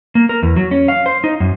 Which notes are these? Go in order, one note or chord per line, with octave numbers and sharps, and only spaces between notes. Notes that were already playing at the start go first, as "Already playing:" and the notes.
A#3
A#4
E2
F#3
C#4
F5
C5
D#4
F#2